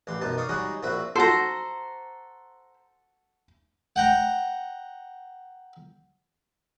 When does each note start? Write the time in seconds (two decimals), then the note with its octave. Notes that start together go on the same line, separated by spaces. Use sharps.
0.07 A1 E3 G4 C6
0.21 F#2 B2 D#4 A5
0.38 D5 F5 C#6 D#6
0.49 G3 G#3 C#4 D#4 F#4 G#4
0.83 A#1 A#2 C4 F#4 E5 B5
1.16 F#4 A4 C5 A#5
3.96 F#5 G5 A#5